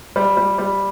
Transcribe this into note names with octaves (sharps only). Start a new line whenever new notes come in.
G3
G3
G3